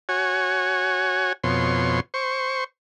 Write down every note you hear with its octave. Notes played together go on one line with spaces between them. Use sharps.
F#4 C#5 G#5
F2 B2 C#5 C6
C5 C#6